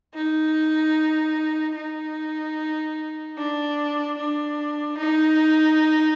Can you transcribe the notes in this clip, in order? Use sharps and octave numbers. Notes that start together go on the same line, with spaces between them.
D#4
D#4
D4
D4
D#4